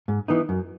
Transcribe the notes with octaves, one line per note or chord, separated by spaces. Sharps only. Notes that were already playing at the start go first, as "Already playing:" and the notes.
G#2
E3 B3 D#4
F#2